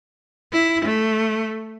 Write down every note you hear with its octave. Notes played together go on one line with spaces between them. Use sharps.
E4
A3